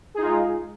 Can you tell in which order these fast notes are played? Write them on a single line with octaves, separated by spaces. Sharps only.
G#4 D#4 F4 G#3